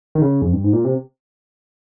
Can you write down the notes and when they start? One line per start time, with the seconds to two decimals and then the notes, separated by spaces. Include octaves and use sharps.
0.15 D#3
0.22 C#3
0.42 F2
0.53 G2
0.64 G#2
0.73 A#2
0.85 C3